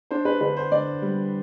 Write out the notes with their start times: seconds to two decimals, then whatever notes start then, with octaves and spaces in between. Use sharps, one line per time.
0.11 D4 C5
0.25 B4
0.40 D3 B4
0.57 C5
0.72 D3 D5
1.02 G3